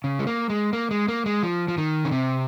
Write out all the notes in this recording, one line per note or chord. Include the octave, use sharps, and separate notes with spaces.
C#3
G#3
A#3
G#3
A#3
G#3
A#3
G#3
F3
F3
D#3
C#3
C3